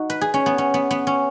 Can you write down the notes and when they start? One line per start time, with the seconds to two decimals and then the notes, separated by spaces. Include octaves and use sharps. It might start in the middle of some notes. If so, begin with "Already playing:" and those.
Already playing: D#4 F#4
0.10 B4
0.21 G#4
0.34 C#4
0.46 B3
0.58 C#4
0.74 B3
0.91 B3
1.07 C#4